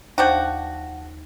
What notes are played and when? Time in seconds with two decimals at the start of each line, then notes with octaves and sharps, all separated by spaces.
0.18 D#2 F3 D4 F#4 G6